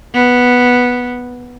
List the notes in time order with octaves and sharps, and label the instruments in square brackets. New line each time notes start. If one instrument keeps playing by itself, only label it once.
[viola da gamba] B3